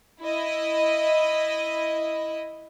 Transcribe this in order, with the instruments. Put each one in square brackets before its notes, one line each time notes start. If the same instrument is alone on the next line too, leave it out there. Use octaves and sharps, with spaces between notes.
[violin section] E4 D#5